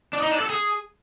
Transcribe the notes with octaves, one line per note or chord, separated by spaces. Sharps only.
D4
D#4
D4
A4
G#4